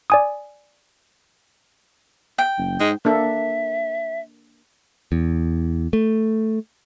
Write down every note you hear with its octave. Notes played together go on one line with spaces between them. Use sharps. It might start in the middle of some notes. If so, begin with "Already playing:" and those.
D5 G#5 D#6
G5
F#1
G#2 G#3
A#3 D4 A4 E5
E2
A3